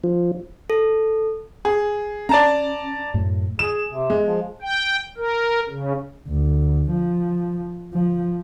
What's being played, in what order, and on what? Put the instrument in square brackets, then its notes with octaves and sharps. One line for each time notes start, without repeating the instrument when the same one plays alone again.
[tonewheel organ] F3
[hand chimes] A4
[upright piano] G#4
[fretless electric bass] C#4 [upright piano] D5 A5 A#5
[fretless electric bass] F#2 A2
[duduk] G#4 [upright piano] E7
[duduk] C3
[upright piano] G#3
[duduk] F3
[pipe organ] G5
A#4
C#3
[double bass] D2
F3
F3